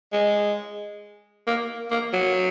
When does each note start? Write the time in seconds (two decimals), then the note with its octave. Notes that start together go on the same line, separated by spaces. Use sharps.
0.13 G#3
1.47 A#3
1.91 A#3
2.13 F#3